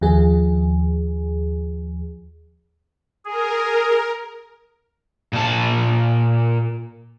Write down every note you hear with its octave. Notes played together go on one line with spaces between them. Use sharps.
D#2 F3 G#4
G#4 A#4
A#2 A5